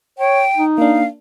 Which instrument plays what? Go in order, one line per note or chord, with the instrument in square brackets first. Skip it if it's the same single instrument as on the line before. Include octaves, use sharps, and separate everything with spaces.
[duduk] C#5 [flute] G5
[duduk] D#4
[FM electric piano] A#3 D4 [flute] F5